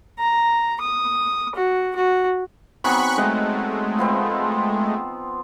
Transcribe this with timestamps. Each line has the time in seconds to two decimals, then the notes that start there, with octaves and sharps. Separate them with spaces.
0.19 A#5
0.81 D#6
1.56 F#4
1.96 F#4
2.84 F#3 B3 C4 D#4 G#5 B5 C#6 F#6
3.18 G#3 A3 D#5 F#5 G5
3.98 F3 B3 C4